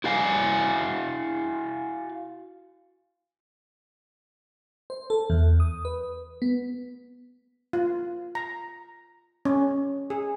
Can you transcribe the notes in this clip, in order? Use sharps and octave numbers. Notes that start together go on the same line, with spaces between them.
E4 F#4 F5 G#5
C5
A4
E2
D#6
B4
B3
F4
A#5
C#4
G#4